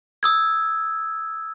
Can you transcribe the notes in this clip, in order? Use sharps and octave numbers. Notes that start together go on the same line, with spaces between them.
D#6 E6 G#6